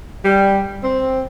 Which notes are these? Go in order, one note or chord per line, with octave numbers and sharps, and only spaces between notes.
G3
C4